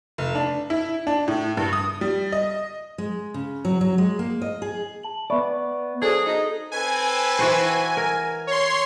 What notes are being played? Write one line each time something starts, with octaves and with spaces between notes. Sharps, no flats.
F1
D4
E4
D4
A2
G2
D#6
G3
D#5
G#3
C#3
F#3
F#3
G#3
A#3
D#5
G#4
A5 F#7
B3 D5 E5 B5 C#6
F#3 D4 G#4 A4 C5
D#4
C4 A4 B4 G#5
E3 F#4 C5
A#4
C#5 C6